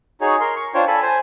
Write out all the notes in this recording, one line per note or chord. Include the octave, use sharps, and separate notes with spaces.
D#4 F#4 G#4 C#5
A#4 C6
C#6
D4 F4 C5 C#5 G5
A4 G#5 A5 B5
C5 G#5